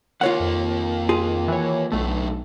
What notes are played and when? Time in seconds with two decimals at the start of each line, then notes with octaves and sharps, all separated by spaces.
0.21 D#2 A#3 F4 C#5 F#5
0.40 F2
1.09 F4 G#4
1.48 E3 C#5
1.92 B1 F#2 A2 A3